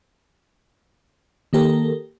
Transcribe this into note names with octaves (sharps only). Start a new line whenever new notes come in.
D#3 A#3 G4 A4 A#4